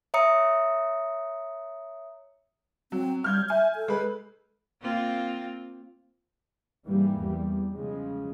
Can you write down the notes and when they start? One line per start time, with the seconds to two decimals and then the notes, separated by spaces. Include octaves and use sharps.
0.14 C#5 E5 A#5 D#6 C#7
2.92 F#3 C4
3.24 G3 F6 G6 G#6
3.50 E5 G#5
3.75 A4
3.88 G#3 B4
4.81 A#3 C4 F4
6.87 G#2 E3 G3 A#3
7.21 E2 G3
7.74 C#3 F3 G#3